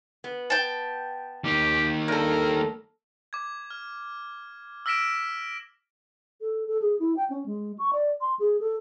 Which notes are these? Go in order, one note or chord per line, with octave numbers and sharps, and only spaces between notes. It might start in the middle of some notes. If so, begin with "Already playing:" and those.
B3
G5 A5
D#3 A#3 G4
G2 A4 A#4
D6 G#6
F6
E6 F6 A#6 B6 D7 E7
A4
A4
G#4
E4
G5
C#4
G#3
C#6
D5
C6
G#4
A4